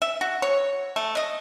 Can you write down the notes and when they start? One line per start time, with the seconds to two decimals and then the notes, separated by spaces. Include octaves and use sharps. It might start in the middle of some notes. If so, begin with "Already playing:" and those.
0.02 E5
0.21 F#4
0.42 C#5
0.96 A3
1.17 D#5